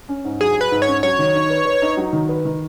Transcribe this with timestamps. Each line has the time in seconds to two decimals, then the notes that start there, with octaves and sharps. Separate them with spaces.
0.09 C#4
0.25 G#2
0.40 F#3 G#4
0.56 G#4 B4
0.71 G#2
0.82 C#5
0.88 C#4
1.03 F#3 C#5
1.19 D#3
1.35 D#4
1.50 B4
1.65 B4
1.82 D#4
1.97 F#3
2.13 D#3
2.29 B4
2.45 D#3